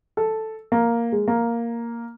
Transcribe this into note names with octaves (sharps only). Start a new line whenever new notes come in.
A4
A#3
G#3
A#3